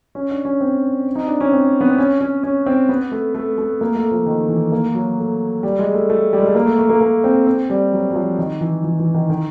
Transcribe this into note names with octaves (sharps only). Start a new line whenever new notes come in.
C#4
D4
C#4
C4
D#4
D4
C#4
C4
B3
C4
C#4
C#4
C#4
C4
B3
A3
A3
A3
A#3
A3
F3
D#3
E3
A#3
F#3
A3
G3
G#3
A3
A3
G3
G#3
A3
A#3
A3
A3
A#3
A#3
C4
C4
G3
F#3
F#3
F3
D#3
E3
E3
E3
D#3
D#3